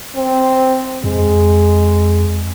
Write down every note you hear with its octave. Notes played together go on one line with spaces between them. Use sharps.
C4
F2 G#3